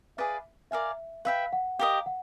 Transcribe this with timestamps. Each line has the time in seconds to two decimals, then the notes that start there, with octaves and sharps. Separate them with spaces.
0.17 G#4 B4 D5 E5 F5
0.71 A#4 D5 E5 F5 G#5
1.25 B4 E5 F5 G5
1.53 F#5
1.79 G4 A#4 D#5 F5
2.06 F#5